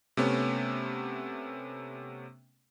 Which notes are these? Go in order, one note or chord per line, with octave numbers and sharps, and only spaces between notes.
C3 A3 B3 C#4